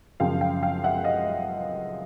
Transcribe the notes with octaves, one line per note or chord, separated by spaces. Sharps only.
F#2 C#3 F3 F5 G5
F5 G5
F5 G5
E5 F#5
D#5 F5